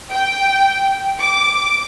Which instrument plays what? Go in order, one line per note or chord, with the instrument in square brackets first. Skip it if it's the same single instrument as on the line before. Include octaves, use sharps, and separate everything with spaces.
[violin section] G5
D6